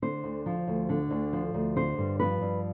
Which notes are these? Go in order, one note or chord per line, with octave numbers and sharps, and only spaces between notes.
D3 C5
D2
F3
D2
D3
D2
F3
D2
D3 C5
G2
F3 B4
G2